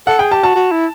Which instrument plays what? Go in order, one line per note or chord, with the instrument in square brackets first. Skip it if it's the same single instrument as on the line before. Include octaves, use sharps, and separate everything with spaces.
[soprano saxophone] A4 [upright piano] F#5
[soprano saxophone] G#4 [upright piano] G5
[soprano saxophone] G4 [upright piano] A5
[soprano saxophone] F#4 [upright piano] A5
[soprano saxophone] F#4
E4